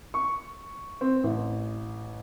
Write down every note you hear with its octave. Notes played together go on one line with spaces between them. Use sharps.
C#6
C4
A1